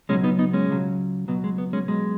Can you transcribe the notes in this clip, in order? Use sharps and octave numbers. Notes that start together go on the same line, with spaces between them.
C#2 B2 F#3 G#3 C#4
B3 D#4
B3 D#4
G#3 C#4
C#2 C#3 F#3
C#2 B2 F#3 B3
G#3
B3
G#3 C#4
B1 B2 F#3 G#3